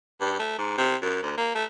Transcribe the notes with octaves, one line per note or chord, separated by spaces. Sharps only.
G2
A3
G#2
C3
F#2
D2
A#3
A3